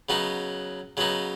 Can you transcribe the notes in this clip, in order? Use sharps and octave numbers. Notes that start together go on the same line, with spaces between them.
C#3 F#3 B3 D#4
C#3 F#3 B3 D#4